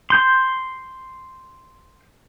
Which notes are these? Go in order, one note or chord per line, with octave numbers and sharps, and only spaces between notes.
C6 G6